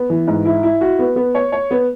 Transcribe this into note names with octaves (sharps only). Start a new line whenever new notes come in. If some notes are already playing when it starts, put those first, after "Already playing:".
Already playing: B3
E3
G#2
E4
E4
F#4
B3
B3
C#5
C#5
B3